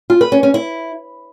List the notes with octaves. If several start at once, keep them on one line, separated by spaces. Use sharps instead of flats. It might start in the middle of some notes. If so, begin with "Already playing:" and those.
F4
B4
C#4
C#4
E4